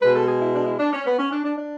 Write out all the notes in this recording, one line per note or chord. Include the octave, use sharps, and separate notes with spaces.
B2 G#3 B4
A4
G#4
E4
D4
E4
D4
C#4
B3
C#4
D4
D4
D4